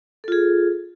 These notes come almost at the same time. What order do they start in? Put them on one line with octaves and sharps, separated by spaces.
A4 F4 G#4